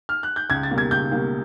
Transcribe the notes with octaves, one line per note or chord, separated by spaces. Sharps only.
F6
F#6
G6
C#2 G#6
A6
B2 G3 A#3
G#6
C#2 G6
B2 G3 A#3